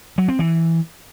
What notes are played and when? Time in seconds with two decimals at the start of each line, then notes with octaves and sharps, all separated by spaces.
0.18 F#3
0.29 C4
0.39 E3